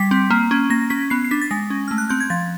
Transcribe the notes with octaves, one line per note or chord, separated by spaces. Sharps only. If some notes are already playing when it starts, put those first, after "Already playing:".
Already playing: G3 B6
C4
A#3
C#4
A#3 A#6
C#4 B6
B3 C7
C7
D4 B6
A6
G#3 A#6
C#4
A3 F6
F#6
C4 G6
G#6
F3 A6